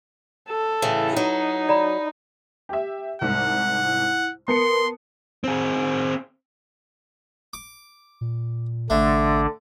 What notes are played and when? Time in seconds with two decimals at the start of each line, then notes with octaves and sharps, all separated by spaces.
0.49 A4
0.82 A2 C#3 E3
1.17 F#3 D#4
1.69 D5 A#5 B5
2.69 G4 E5
3.21 C2 G#2 F#5
3.85 E4
4.48 B3 A#4 A5 C6 C#7
5.44 C4 G#4
7.53 D6
8.21 A#2
8.90 A1 D3 A3 D4